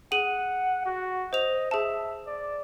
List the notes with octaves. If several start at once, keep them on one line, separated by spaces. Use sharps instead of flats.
G#4 F#5 D#7 F#7
F#4
C5 D#5 F7
G#4 E5 A5
D5